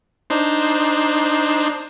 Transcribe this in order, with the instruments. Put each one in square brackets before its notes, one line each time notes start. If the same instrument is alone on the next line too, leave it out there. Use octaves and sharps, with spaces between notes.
[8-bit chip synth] D4 D#4 C5